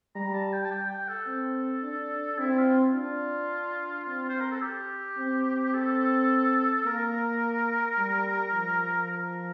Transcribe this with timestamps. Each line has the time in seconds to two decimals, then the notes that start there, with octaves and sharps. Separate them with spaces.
0.15 G3 A#5
0.34 A5
0.53 G5
0.65 A5
0.71 G5
0.90 G5
1.09 A4
1.27 C4
1.83 D4
2.39 C4 E4
2.58 F4
2.95 D4 F4
4.07 C4
4.29 C5
4.41 A#4
4.51 A4
4.62 G4
5.19 C4
5.74 A4
6.86 A#3 A#4
7.98 G3
8.53 F3
9.10 A#4